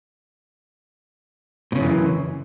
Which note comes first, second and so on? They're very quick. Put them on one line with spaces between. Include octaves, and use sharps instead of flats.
A2 C#3 F#2 E3